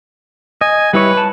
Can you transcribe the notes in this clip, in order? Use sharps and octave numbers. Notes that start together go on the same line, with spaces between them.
D#5 G#5
G3 E4 B4 C#5
A5